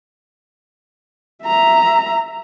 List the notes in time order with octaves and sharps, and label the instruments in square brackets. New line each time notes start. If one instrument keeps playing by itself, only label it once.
[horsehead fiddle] E5 A#5